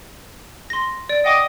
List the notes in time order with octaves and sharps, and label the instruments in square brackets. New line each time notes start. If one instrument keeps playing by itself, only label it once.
[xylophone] C6 A#6
D5 D7
[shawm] D#5 [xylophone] F#5 G5 D6